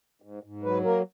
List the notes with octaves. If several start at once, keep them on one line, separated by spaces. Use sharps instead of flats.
G#2
G#2
F#3 B4
A#3 A#4